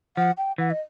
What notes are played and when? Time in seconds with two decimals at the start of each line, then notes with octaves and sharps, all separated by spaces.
0.17 F3 F#5
0.38 G5
0.58 E3 F#5
0.70 D#5